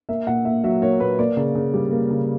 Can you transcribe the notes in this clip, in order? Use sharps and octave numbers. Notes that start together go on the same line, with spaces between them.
A#3 E5
A#2 F#5
A#2 E5
F#3 E5
A#3 C#5
A#2 B4
A#3 D5
C#3
C#3
G3
A#3
C#3